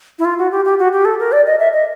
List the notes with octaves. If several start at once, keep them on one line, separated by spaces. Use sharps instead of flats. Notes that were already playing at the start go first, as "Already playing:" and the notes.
E4
F4
F#4
G4
G4
F#4
G4
A4
A#4
D5
D#5
E5
D#5